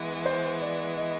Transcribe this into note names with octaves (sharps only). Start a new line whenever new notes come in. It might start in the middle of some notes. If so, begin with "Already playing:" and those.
Already playing: E3 G#3 B3
C5
D5
D#5